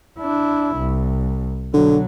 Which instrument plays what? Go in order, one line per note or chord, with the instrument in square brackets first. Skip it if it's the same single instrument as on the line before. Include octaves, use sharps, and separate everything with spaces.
[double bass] D4 E4
C2
[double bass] B2 F#3 [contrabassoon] D3